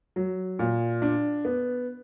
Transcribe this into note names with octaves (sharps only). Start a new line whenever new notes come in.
F#3
A#2
D4
B3